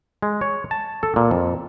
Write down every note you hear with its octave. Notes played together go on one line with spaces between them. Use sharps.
G#3
C#5
A5
A4
A#2
F2